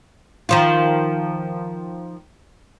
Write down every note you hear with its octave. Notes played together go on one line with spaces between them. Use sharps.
D#3 F3 F4